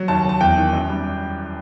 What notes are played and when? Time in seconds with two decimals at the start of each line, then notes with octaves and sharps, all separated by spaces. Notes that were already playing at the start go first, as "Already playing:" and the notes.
Already playing: F#3
0.08 D#2 A5
0.24 F#3 A5
0.40 E2 G5
0.57 D#3
0.73 F#2
0.89 G3